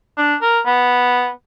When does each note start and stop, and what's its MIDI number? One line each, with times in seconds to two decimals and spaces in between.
0.17 0.35 62
0.42 0.60 70
0.66 1.29 59